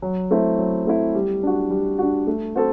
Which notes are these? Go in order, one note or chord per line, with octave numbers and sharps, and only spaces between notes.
F#3
A3 C4 E4
F#3
A3 C4 E4
G3
D4 F#4
G3
D4 F#4
A3
C4 F#4 A4